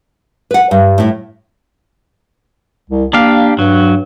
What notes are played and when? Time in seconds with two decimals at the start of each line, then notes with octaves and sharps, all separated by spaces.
0.51 B4 F#5
0.71 G2
0.98 A2 E4
2.90 C2
3.13 A#3 D4 G4 F5
3.59 G2 F#3